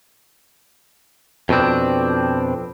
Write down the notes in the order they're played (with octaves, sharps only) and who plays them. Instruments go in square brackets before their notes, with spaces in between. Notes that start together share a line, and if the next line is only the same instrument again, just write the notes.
[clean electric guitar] F2 B2 G#3 C4 D4